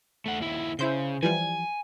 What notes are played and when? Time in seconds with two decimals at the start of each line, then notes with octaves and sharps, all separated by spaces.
0.26 A3 F#5
0.40 D#2 E4
0.79 C#3 E4 C5 G6
1.23 E3 F3 G3 G#5